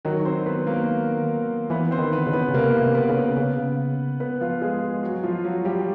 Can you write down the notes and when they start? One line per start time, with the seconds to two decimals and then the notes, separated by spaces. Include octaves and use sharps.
0.05 D#3 F#3 F#4
0.25 C4 C5
0.46 B3 B4
0.67 A#3 A#4
1.70 E3 B3 B4
1.91 C4 C5
1.98 D#3
2.12 B3 B4
2.27 C#3
2.33 B3 B4
2.49 C#3
2.54 C3 A#3 A#4
2.81 C3
2.95 B3 B4
3.09 C#3
3.37 C#3
4.20 B3 B4
4.40 F3 F4
4.62 G#3 G#4
5.03 F#3 F#4
5.23 F3 F4
5.44 F#3 F#4
5.65 G3 G4